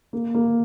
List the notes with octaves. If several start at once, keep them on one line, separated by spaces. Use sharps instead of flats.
A#3
A#3